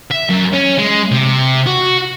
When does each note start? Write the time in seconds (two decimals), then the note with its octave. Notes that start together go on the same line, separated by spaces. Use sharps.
0.11 E5
0.29 F#2
0.53 C#4
0.78 G#3
1.11 C3
1.67 F#4